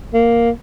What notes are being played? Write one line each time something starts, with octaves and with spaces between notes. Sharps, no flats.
A#3